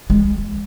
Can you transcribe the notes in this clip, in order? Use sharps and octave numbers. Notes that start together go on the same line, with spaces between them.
G#3